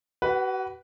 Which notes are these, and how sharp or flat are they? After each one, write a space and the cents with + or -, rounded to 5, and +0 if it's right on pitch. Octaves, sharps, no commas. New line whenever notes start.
F#4 +40 B4 +0 F#5 +0